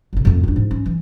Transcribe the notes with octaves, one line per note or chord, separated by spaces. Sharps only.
G1 C3
F2 A3
D#2 D4
G#2
C#4
E3